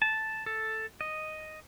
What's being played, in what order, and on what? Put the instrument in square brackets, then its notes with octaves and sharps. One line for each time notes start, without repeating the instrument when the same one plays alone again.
[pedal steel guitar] A5
A4
D#5